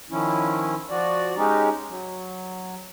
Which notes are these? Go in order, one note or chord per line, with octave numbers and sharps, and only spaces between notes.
D#3 F3 C#4 E4
F3 F#4 D5
G#3 C#4 D#4 G4
F#3